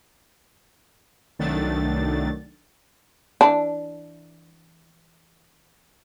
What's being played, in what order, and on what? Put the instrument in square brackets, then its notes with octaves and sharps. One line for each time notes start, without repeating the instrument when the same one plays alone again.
[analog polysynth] C2 D#3 F#3 A3 D4 A6
[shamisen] E3 D4